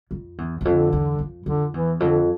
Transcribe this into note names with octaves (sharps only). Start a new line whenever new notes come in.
F2
E2
E2
F2 D3
E2
F2
F2 D3
E2 E3
F2 D3